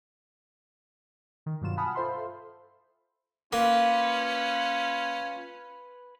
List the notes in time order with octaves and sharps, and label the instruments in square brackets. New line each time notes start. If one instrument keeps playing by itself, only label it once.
[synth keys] D#3
G2 B2 F#3 F4 E7
F#5 G#5 A5 B5 D#6 F6
F4 A4 C5 E5 B5 C6
[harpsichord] A#3 [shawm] C#4 [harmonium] F4 [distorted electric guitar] B4